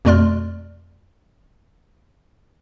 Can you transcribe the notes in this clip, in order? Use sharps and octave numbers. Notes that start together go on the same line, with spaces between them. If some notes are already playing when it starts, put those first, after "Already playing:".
F2 B2 A3 D5 C6 F6